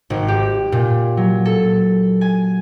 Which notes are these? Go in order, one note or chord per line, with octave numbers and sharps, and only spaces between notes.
G#1
G4
A#2
F#3
A4
G#5